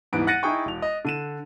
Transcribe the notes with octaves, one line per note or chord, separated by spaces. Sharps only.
D#1 G#2 E3 B3 D7
F#5 F#6 A6 A#6 C#7 D#7
D#4 E4 G#4 G5 C#6
E1 F7
D#5
D3 D#7 E7